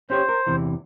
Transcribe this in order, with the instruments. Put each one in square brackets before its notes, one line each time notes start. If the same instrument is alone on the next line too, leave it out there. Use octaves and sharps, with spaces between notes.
[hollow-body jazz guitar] C#4 G4 C#5 [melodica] C5
[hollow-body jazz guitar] A#4
E2 C3 E3